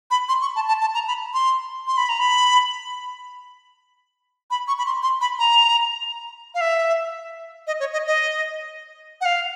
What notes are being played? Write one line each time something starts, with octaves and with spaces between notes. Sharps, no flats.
B5
C6
C#6
A5
A5
A5
A#5
B5
C6
C6
B5
A#5
B5
B5
C#6
B5
C6
C6
B5
A#5
F5
E5
D#5
C#5
D#5
D#5
F#5
F5